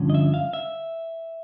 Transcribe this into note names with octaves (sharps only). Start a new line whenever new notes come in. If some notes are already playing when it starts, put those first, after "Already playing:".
Already playing: G2 D3 F3 C#4
D#5
E5
F5
E5